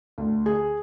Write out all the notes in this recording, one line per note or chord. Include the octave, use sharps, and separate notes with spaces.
D2
G#4